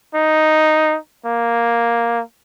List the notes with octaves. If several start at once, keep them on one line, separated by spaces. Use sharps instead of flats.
D#4
A#3